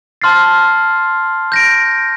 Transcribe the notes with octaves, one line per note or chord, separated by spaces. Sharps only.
A5 C6 F6 A6 C7
G6 A#6 D7